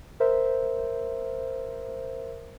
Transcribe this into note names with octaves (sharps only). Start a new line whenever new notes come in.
A#4 C5 E5